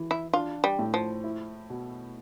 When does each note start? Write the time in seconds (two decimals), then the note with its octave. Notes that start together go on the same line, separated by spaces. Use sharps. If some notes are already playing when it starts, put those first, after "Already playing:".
Already playing: E3
0.11 E4
0.33 D4 F4
0.64 G3
0.79 A2
0.94 F3
1.24 E4
1.70 B2